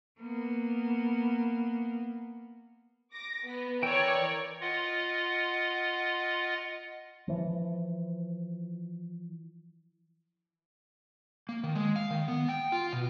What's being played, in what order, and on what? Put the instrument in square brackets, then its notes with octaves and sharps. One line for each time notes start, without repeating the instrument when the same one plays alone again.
[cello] A#3 B3
[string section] D6 A#6
B3
[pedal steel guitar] E3 G5 [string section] A#4 C#5 D5
[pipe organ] F4 D#5 F#5
[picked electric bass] E3 F3
[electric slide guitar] A#3
D#3
G#3
F5
D#3
B3
G5
F4
B2